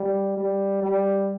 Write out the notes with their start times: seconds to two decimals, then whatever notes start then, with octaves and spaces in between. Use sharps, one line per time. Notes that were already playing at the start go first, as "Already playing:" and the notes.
Already playing: G3
0.37 G3
0.82 G3